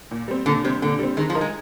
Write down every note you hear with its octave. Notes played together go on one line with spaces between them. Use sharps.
A#2
G3 C4
A#2 D3
C3 G3 C4
A#2 D3
G3 C4
D#3 G#3
F3
D#4 A#4
G#3